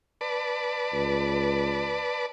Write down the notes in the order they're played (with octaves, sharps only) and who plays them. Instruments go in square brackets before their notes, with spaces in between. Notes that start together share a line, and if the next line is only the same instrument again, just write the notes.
[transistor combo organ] B4 D5 A5
[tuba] C#2